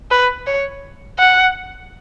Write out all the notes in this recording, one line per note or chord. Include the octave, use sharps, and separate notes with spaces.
B4
C#5
F#5